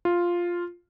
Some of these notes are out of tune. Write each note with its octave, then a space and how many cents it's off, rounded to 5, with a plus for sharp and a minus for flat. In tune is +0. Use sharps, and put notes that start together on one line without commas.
F4 +0